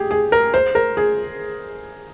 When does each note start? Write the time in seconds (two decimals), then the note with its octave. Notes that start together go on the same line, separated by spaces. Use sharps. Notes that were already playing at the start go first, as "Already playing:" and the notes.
Already playing: G4 G#4
0.11 G#4
0.32 A#4
0.54 C5
0.75 A#4
0.97 G#4